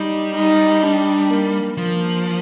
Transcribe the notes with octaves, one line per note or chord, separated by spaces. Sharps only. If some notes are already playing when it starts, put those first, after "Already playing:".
Already playing: G3 D#4
D#4
D4
A#3
F3 A#3